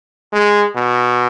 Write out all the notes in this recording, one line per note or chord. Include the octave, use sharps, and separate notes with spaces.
G#3
B2